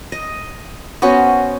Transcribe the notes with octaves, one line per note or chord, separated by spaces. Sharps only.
D#5
B3 C#4 F#4 C5